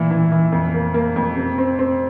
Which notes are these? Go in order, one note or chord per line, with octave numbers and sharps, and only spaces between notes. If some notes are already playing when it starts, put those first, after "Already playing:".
Already playing: A#2 E3 E4
E3
E3
F2
A#3
A#3
F2
C3
C4
C4